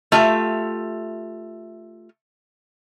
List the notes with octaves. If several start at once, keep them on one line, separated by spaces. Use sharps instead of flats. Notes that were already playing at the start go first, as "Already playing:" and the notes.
A3 F4 G4 E5